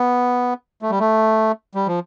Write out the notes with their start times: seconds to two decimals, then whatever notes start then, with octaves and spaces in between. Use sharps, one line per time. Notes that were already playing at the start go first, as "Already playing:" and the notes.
Already playing: B3
0.82 A3
0.90 G3
0.99 A3
1.75 G3
1.87 F3